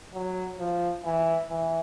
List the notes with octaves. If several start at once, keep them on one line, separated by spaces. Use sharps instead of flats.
F#3
F3
E3
E3